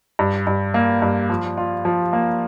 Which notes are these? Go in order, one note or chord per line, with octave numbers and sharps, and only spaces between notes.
G2
G2
A#3
G2
F3
F4
F3
A#3